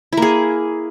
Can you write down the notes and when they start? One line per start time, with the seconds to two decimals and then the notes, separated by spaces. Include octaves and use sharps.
0.13 E4
0.17 A#3
0.22 G#4